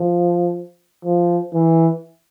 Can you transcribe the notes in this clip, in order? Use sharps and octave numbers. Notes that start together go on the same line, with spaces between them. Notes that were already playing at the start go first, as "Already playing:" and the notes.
Already playing: F3
F3
E3